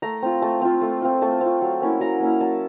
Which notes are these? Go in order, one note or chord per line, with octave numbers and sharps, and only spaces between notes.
A3 A#5
C4 F4
A3 A5
C4 F4
A3
C4 F4
A3 A5
C4 F4
F#3
A#3 C#4 E4
F#3 A#5
A#3 C#4 E4
F#3 A5